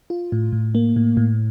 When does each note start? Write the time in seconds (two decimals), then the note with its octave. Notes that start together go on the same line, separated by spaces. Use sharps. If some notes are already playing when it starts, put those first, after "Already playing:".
0.10 F4
0.32 A2
0.53 A2
0.75 A#3
0.96 A2
1.17 A2